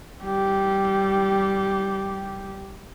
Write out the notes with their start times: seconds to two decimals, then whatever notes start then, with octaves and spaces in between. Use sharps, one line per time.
0.23 G3 G4